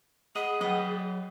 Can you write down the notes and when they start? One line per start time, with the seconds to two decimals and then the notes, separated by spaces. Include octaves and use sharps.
0.35 G#4 D#5 F#5 B5
0.61 F#3 B4 D#5 F#5 G5